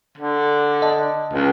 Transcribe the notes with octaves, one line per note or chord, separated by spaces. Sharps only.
D3
D#5 A5
C#2